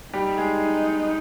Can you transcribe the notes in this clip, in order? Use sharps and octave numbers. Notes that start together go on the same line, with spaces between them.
G3 D#4 G4
G#3 G#4